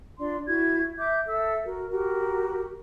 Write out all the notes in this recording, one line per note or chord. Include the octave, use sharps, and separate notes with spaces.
D4 F4 D5 C6
E4 F#4 G#6
E5 D6 G6
A4 E5 E6
F#4 A#4
F#4 G4 A#4